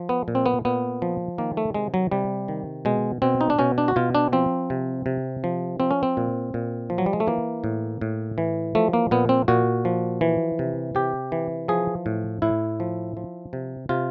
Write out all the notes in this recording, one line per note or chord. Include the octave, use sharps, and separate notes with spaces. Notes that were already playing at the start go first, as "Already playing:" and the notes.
Already playing: F3
B3
A#2
C4
B3
A#2 B3
F3
D#3 A#3
A3
C3 G#3
F#3
C3 G3
D#3
B2 G#3
B2 C4
D#4
D4
B2 C#4
D4
F#4
B2 F4
D4
F3 C4
C3
C3
F3
F3 C4
C#4
C4
A#2
A#2
F3
F#3
G3
G#3
A3
E3 A#3
A2
A2
E3
F3 A3
A#3
A#2 B3
C4
A#2 F#4
F3
E3
C3
C3 G4
E3
F3 G#4
A2
A2 E4
F3
F3
C3
C3 F4